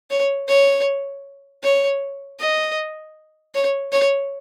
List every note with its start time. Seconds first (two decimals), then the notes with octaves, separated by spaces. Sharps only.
0.10 C#5
0.48 C#5
1.63 C#5
2.40 D#5
3.54 C#5
3.92 C#5